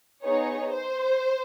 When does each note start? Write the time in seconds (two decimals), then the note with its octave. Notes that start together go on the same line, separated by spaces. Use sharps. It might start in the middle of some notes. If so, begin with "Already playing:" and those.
0.24 B3 D#4 G#4 C#5
0.74 C5